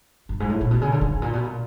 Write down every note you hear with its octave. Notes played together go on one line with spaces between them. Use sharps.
F#2
G#2
A2
A#2
B2
C#3
D3
C#3
G#2
A#2
B2
A#2